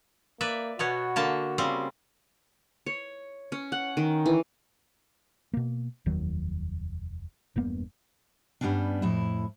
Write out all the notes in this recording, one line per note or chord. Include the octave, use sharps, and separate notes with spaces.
A#3 B4 D5 E5
B2 B3 F#4 C#5
D3 A#3 A5
C#3 G3 C4
C#5
C#4
F#5
D#3
E3
B2 A#3
F1 D#2 D#3 F#3
E1 G2 A#3 B3
G2 G3 A#3 B3 C#4 D4
F2 A2 E4